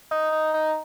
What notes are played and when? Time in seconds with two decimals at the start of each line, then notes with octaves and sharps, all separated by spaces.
0.11 D#4
0.32 D#4
0.54 D#4